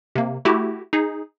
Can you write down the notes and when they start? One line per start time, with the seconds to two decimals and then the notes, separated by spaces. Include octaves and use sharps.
0.15 C3 A#3
0.45 A3 E4 F#4 G4
0.93 D#4 G#4